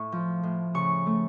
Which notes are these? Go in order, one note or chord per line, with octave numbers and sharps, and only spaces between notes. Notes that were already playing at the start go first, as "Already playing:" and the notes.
Already playing: A2 C#6
F3
A2
C#3 C#6
A3